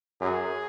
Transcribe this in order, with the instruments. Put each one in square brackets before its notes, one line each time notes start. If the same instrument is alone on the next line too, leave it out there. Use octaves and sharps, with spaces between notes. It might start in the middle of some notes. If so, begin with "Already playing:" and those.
[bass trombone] F#2 [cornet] G#4